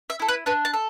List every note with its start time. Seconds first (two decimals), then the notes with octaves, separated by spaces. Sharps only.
0.10 E5
0.20 E4 A4
0.28 B4
0.46 D4 B4
0.65 A5
0.73 A4